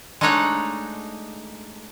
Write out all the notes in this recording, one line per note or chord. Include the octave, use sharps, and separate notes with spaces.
G#3 A3 D4 D#4 C#5 F#5